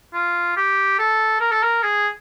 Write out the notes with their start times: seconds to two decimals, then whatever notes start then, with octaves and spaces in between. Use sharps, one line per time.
0.14 F4
0.57 G4
0.99 A4
1.41 A#4
1.52 A4
1.63 A#4
1.83 G#4